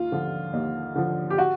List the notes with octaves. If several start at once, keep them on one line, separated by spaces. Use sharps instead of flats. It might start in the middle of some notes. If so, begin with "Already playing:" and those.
Already playing: D#2 F4
D3 F3
D#2
D3 F3
G4
F#4